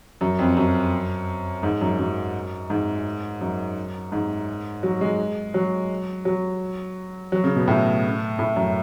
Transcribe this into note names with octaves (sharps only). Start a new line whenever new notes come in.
F#2
F2
F#2
G#2
F#2
F#2
G#2
F#2
G#2
F#3
G#3
F#3
F#3
F#3
C#3
B2
A2
A2
F#2